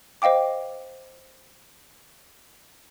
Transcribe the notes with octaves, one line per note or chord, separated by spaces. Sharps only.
C5 D#5 F5 G5 D6